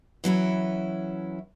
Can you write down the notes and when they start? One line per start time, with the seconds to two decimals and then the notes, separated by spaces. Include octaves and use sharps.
0.24 E3 F#3 C#4 E4